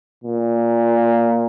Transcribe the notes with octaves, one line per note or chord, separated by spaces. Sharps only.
A#2